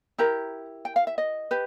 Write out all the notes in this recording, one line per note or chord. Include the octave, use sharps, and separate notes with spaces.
E4 G4 A#4 A#5
G5
F5
E5
D#5
G4 B4